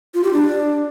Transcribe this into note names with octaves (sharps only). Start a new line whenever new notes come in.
F4
G4
D4